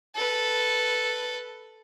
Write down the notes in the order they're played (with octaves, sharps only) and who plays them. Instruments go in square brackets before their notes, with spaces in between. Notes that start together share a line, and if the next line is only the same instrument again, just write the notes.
[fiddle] A4 B4